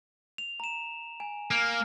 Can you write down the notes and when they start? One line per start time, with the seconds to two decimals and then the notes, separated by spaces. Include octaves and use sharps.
0.38 F7
0.60 A#5 E7
1.20 G#5
1.51 A#3 F6